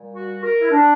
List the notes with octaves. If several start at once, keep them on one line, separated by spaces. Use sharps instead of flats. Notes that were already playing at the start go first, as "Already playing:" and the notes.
Already playing: A#2 G3
F#4
A#4
E4
D4